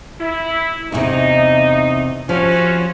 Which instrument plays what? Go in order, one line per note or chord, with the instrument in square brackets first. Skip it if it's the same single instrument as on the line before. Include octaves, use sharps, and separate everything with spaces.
[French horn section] E4
[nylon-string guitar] E2 A2 C3 [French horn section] D#4
[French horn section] C3 C#4 F#4 [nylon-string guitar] F3